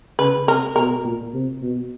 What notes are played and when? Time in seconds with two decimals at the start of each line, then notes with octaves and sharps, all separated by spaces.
0.19 C#3 B4
0.47 C3 A#4
0.76 B2 A#4
1.05 A#2
1.34 C3
1.62 B2